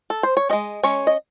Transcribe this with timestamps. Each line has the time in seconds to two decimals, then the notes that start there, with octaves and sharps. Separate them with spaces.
0.10 A4
0.23 C5
0.37 C#5
0.49 G#3 C#4 D#5
0.83 G#3 C#4 C#5
1.07 D#5